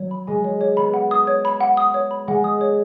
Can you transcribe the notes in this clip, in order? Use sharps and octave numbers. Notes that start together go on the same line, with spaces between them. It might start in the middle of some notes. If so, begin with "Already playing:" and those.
Already playing: F#3 C#5
B5
G#3 G#5
C#5
C#5
B3 B5
F#5
D#6
C#5
B5
F#5
D#6
C#5
B5
G#3 F#5
D#6
C#5